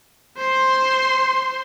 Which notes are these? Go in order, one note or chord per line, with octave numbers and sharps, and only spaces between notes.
C5 C6